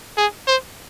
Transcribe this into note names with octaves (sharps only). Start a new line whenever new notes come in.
G#4
C5